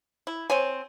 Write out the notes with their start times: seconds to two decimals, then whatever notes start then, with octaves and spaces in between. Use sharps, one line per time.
0.27 E4
0.50 C4 C#5 G#5